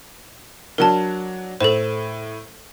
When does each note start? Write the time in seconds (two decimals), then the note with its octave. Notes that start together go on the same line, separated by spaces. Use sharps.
0.78 F#3 D4 A#4 A5
1.61 A2 A4 C5 E7